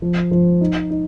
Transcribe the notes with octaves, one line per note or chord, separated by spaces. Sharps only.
F3
F3
D#4
D#4